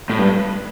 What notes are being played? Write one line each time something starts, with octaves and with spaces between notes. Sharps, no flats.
A2
G2